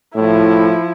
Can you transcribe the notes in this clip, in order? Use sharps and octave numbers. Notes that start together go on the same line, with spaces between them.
A2 F3 E4